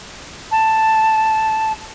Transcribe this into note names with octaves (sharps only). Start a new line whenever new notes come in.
A5